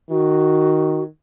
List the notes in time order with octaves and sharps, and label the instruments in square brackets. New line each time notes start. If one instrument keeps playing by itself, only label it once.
[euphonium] D#3 [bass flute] F#4